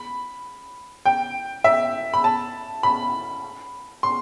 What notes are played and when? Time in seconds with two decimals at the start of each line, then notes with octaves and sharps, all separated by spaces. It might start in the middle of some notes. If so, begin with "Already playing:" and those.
Already playing: B5
1.06 G5
1.64 E5
2.14 B5
2.24 A5
2.83 B5
4.03 C6